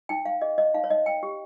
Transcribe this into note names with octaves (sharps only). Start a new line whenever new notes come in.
D#4 G5
D#4 F5
G#4 D#5
C#5 D#5
D#4 F5
C#5
D#4 D#5
C#5 G5
G4